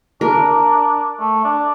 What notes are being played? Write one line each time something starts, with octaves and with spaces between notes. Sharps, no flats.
D4 A#4
A3
D4